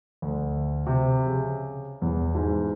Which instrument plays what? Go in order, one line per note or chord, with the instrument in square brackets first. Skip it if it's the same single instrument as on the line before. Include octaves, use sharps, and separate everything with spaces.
[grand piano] D2
C3
C#3
E2
G#2